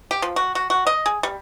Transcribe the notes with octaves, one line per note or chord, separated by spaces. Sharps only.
G4
F3
F#4
F#4
F#4
D#5
G#4
G3